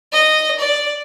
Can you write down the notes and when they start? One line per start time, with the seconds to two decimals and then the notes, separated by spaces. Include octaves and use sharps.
0.12 D#5
0.59 D5